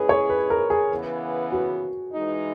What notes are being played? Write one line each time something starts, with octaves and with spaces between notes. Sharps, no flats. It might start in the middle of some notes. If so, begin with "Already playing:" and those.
Already playing: G#3 C#4 E4 G#4 B4
C#5
B4
A#4
G#4
C#3 E3 B3
F#4
E3 G#3 D#4